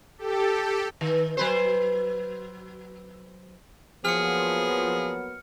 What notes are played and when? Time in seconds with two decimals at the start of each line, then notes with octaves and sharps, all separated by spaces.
0.18 G4 A4
1.01 D#3
1.37 F#3 B4 C5
4.05 F3 F#3 A#3 B3 G#4 F6 C#7